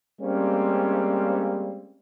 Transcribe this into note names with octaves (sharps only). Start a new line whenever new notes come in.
G3 G#3 A#3 C4 C#4